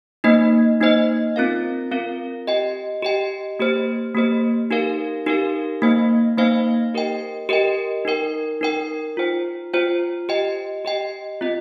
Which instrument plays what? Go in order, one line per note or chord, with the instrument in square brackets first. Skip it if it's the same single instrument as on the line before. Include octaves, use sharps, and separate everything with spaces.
[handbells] A#3 D#4 C5 D#5
A#3 D#4 C5 D#5
C4 F4 A#4 F5
C4 F4 A#4 F5
G4 D#5 G5
G4 D#5 G5
A#3 G4 C5
A#3 G4 C5
D#4 G4 A#4 F5
D#4 G4 A#4 F5
A#3 D#4 C5 F5
A#3 D#4 C5 F5
G4 A#4 D#5 G5
G4 A#4 D#5 G5
D#4 A#4 G5
D#4 A#4 G5
F4 C5 G5
F4 C5 G5
G4 D#5 G5
G4 D#5 G5
C4 F4 D#5